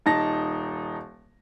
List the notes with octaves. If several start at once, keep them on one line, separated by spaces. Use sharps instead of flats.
D#1 D#4 A5 A#6